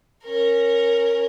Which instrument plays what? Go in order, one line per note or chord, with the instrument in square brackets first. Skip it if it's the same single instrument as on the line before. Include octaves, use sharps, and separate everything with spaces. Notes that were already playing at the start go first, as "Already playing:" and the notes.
[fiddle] C#4 A#4